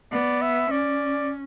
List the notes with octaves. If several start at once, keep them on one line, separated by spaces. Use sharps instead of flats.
B3 D5
E5
C#4 D5